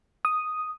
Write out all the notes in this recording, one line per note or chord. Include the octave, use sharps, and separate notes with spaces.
D#6